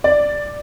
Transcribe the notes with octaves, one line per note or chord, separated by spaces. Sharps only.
D5